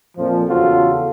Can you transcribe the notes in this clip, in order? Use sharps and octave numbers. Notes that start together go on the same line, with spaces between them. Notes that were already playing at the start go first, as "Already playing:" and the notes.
F2 A#2 F3
E2 C#3 F4 F#4 A4